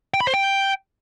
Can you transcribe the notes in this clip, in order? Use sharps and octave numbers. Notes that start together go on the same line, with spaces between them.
G5
B5
C5
G5